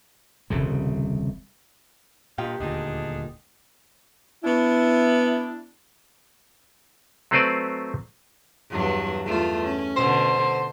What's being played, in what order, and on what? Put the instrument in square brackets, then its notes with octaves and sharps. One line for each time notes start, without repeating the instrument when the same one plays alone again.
[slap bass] D#1 C2 C#3 G3
[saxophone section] G2 D#4 F5 [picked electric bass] A#2 [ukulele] G4
[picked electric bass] D#1 D2 A#2 [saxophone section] D4 D#4 G#4
[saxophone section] B3 D4 E4
[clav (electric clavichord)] F#3 A3 C4 B4 C5 D5
[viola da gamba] E2 G2 F#3
E2 A3 F4
C#4
[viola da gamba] B2 D3 [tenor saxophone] C5